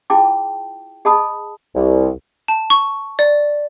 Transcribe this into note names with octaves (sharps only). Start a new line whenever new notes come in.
E4 F4 G#4 G5 A5 D6
G#4 D#5 A5 B5 D#6
C2
A5
C#6
D5